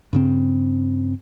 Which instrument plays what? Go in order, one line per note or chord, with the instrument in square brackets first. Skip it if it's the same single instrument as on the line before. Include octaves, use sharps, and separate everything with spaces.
[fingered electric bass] G2 C#3 C4